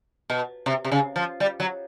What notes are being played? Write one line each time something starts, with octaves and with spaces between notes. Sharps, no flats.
B2
C3
C3
C#3
F3
G3
F#3